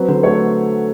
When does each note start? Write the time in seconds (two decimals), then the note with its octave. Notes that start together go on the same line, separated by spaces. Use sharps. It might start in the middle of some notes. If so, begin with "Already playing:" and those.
Already playing: F#3 C4 B4
0.08 D3 C5
0.23 A3 C#5